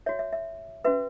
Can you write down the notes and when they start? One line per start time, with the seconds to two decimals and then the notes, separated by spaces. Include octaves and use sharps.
0.06 F#4 C#5 E5
0.19 E5
0.32 E5
0.85 C#4 F#4 B4 E5